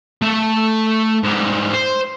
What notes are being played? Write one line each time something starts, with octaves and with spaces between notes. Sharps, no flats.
A3 E5
G#2 G3
C5